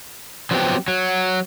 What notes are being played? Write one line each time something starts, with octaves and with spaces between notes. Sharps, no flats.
F3 F#3 B3 C4 E4 G4
F#3